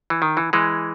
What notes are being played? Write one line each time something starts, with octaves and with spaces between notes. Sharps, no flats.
E3
D#3
E3
E3 G#3